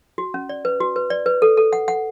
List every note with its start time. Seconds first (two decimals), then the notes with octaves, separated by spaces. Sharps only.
0.18 F#4
0.34 C#4
0.49 D5
0.65 B4
0.81 F#4
0.96 B4
1.10 D5
1.26 B4
1.42 A4
1.57 A4
1.73 F#5
1.88 F#5